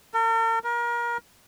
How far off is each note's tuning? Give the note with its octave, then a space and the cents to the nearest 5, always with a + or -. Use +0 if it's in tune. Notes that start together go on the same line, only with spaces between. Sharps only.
A#4 -45
A#4 +30